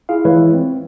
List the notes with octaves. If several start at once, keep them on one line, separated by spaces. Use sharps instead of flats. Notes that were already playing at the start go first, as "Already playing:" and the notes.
E4 F4 G#4 F5
E3 G#3 E4 B4 C#5
C4